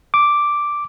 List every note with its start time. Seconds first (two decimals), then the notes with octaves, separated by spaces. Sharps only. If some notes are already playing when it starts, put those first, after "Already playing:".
0.14 D6